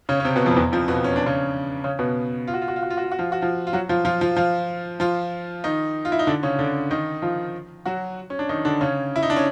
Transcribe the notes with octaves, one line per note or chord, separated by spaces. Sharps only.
C#3 C#4
C#4
C3 C4
B2 B3
F2 F3
E2 E3
F2 F3
B2 B3
C#4
D4
C#3 C#4
C#3 C#4
B2 B3
F4
F#4
F4
F#4
F4
F#4
F4
F#4
F4
F#4
F3 F4
F#4
F3 F4
F4
F#3 F#4
F3 F4
F3 F4
F3 F4
F3 F4
F3 F4
D#3 D#4
F4
E4
D#4
D3 D4
C#3 C#4
D3 D4
D#3 D#4
F3 F4
F#3 F#4
C#4
D4
D#3 D#4
D3 D4
C#3 C#4
E4
D#4
D4
C#4